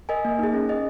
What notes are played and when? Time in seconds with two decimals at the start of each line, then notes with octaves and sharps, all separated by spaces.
0.09 A#4 D#5 G#5
0.25 A#3
0.39 D#4 G#4
0.54 C#4
0.69 G#4 D#5